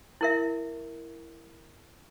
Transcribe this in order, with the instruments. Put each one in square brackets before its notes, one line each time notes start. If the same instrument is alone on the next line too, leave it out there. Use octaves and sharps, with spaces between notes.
[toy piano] E4 A#4 E5